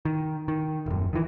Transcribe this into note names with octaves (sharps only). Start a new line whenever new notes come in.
D#3
D#3
D#1 F#2
D#3 E3